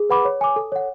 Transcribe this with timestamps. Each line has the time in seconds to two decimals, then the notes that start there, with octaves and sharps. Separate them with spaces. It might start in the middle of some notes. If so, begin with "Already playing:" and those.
Already playing: G#4
0.09 B4 F#5 B5 D6
0.25 C#5
0.41 G#5 D6
0.56 A4
0.72 C#5 F#5